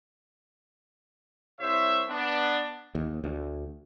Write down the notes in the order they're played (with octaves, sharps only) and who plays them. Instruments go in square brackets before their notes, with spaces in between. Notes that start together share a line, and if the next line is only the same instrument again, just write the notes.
[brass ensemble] C2 C5 C#5 E5
B3 D4
[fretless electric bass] D#2
D2